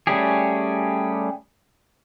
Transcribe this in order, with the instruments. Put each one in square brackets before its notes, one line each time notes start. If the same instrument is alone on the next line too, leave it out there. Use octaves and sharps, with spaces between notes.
[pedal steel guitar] G3 A3 C#4 G4 G#4